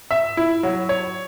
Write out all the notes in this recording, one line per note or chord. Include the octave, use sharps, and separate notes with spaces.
E5
E4
F#3
C#5